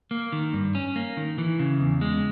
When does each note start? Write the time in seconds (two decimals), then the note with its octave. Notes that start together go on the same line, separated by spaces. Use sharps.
0.11 A#3
0.32 D#3
0.53 G2
0.75 C#4
0.96 A#3
1.17 D#3
1.38 E3
1.59 C#3
1.80 E2
2.01 G#3